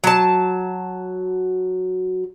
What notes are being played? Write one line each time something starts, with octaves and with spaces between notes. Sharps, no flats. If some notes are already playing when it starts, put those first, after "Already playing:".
F#3 A5